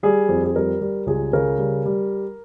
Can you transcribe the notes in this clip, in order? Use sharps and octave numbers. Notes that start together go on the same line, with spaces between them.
G3 G#4
F2
G#4
G3 A#4
G3
C#2 G#4
C#3 A#4
G3
G3